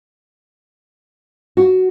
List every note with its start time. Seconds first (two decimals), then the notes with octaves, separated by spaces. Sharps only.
1.57 F#4